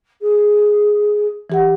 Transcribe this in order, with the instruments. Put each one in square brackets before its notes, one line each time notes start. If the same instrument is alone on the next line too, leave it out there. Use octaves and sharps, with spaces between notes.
[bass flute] G#4
[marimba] E3 G4 F#5